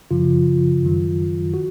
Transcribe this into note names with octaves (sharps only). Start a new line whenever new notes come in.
F#2 C#3 F3 F4
F#2 D#3 F#3
F#4